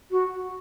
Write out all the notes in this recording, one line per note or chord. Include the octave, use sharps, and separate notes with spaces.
F#4